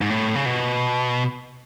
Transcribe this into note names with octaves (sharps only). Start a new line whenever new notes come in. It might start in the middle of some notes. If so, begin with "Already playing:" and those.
G#2
A2
C#3
B2